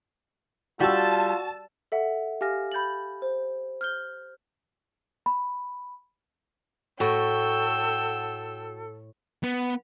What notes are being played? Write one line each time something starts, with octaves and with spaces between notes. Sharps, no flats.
G3 F4 F#4 A5 E6
A4 E5 F#5
G4 F5 G#5 F6 A#6
B5 G6 A6 F#7
C5
F6 G6 G7
B5
A2 F#4 A4 G5 E6
B3